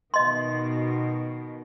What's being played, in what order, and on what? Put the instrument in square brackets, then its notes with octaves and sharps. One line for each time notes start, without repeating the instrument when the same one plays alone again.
[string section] B2 D#3 [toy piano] D#5 C6